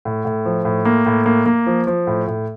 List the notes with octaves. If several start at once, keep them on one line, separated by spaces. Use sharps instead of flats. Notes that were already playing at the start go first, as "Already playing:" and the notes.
A2
A2
F3
A2
A#3
A2
A#3
A#3
F3
F3
A2
A2